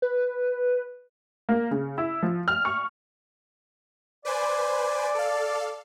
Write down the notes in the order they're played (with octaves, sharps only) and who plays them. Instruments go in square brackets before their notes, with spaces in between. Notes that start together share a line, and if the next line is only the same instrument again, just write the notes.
[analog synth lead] B4
[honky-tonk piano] A#3
C#3
E4
F3
F6
C#6
[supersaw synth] B4 C5 G#5 [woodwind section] D5
[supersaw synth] A4 F5